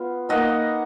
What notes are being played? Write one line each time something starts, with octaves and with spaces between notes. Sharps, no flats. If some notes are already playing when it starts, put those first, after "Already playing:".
Already playing: B3 F4
A#3 D#4 D#5 F#5